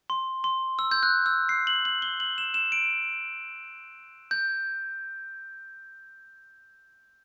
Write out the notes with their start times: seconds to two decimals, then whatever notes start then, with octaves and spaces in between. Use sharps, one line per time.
0.10 C6
0.44 C6
0.79 E6
0.91 G6
1.03 F#6
1.26 E6
1.49 C7
1.67 F#7
1.85 F#7
2.02 G7
2.20 F#7
2.38 E7
2.54 E7
2.72 D7
4.31 G6